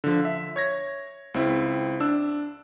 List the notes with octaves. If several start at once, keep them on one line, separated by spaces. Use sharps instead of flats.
D3 F3
E5
C#5 G#6 A#6
C#2 C4 E4
D4 E6